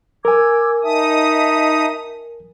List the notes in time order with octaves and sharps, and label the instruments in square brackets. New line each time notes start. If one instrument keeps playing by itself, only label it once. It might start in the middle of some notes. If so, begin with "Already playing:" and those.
[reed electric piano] A#4 G#5 [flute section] D6 E6 G#6
[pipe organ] D#4 D#6 [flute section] E5 A5